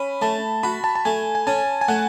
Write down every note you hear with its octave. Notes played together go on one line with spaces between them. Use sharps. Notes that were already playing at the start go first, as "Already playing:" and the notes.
Already playing: C#4 B5
A3 A5
F#4 B5
A5
A5
A3 G#5
G#5
C#4 A5
G#5
A3 F#5